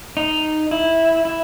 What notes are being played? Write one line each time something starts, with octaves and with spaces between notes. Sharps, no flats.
D#4
E4
E4